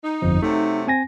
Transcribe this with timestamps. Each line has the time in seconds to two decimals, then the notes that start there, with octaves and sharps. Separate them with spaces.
0.04 D#4
0.22 G1 F2 F3
0.43 C3 F#3 A3 D#4
0.87 C4 G#5 A#6